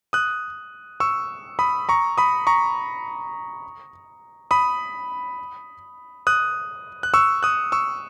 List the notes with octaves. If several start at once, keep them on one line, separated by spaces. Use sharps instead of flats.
D#6 F#6
C#6 E6
B5 D#6
A#5 C#6
B5 D#6
A#5 C#6
B5 D#6
D#6 F#6
F#6
C#6 E6
D#6 F#6
C#6 E6